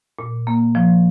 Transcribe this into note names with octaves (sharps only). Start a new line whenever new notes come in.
A#2
A#3
F3